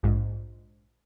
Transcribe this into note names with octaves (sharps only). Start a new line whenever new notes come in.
A#1 G#2